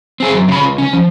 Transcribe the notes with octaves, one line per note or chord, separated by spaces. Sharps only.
C4 G#4
F#2
C#3 B5
C#2
C#4
F3